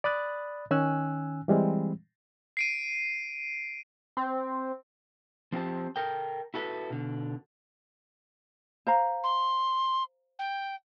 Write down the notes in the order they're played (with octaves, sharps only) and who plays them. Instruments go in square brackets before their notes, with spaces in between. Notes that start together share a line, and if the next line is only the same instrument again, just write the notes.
[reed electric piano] D5 B5 D#6 F#6 A6
D#3 C#4 G#5 E6 F#6
E3 G3 G#3 C4
[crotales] C7 D7 D#7
[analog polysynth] C4
[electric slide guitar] F3 C4 G4 C5 A5
A4 A#4 G5
E4 F#4 A4 B4
B2 D3
[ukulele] C5 F5 A#5
[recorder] C6
G5